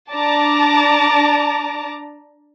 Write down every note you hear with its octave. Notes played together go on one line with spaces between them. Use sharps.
D4 A5 A#5 D6